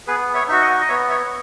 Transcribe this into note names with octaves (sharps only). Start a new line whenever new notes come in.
B3 G#4 B4
C#5 E5
D#4 F#4 E5
D#5 F#5
D#5
B3 C#5 E5
C#5 E5